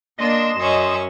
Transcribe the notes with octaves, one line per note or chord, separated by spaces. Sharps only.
A#3 D4 D#5 C6 E7
F#2 C#4 C#6